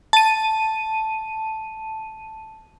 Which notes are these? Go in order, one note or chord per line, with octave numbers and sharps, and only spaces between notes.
A5 D#7